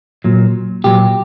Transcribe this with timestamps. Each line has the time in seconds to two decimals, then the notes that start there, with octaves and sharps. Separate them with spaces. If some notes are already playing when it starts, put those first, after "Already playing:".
0.24 A#2 F#3
0.84 A#2 F#3 G4